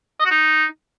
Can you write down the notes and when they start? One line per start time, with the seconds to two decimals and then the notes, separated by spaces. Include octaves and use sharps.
0.20 D#5
0.25 F#4
0.31 D#4